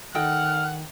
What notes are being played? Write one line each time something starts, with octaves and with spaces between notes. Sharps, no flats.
D#3 D#4 A4 F#5 G5 F6